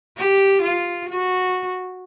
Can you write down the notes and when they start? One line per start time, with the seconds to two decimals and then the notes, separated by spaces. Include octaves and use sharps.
0.17 G4
0.62 F4
1.09 F#4